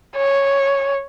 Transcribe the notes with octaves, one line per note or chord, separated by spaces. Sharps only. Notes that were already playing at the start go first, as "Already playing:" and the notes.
C#5